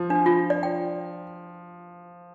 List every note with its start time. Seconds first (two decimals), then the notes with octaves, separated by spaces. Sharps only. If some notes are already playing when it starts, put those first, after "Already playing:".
Already playing: F3
0.10 D4
0.26 F4
0.50 D5
0.63 G5